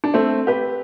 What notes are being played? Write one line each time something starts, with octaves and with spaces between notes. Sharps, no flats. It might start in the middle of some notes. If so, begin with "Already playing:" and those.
D4
A3 C4
G4 B4